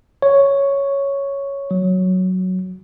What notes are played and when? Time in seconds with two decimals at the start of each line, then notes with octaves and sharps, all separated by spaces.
0.22 C#5
1.71 F#3